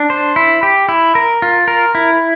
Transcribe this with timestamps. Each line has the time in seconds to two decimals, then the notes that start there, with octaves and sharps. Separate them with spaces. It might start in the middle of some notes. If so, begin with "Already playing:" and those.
Already playing: D4
0.10 C5
0.36 E4
0.63 G4
0.89 E4
1.15 A#4
1.42 F4
1.68 A#4
1.95 E4